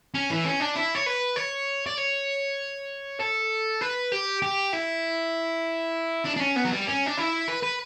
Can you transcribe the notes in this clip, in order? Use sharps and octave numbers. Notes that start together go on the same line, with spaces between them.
C#4
E3
C#4
D4
E4
C#5
B4
C#5
D5
C#5
A4
B4
G4
G4
E4
D4
D4
C#4
B3
F#3
G3
C#4
D4
E4
B4
B4